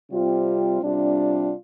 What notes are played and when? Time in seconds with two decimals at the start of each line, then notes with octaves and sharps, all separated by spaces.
0.10 C3 G3 C4 F4
0.81 C3 G3 D4 F4